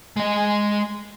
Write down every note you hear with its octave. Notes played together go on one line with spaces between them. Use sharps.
G#3 D#5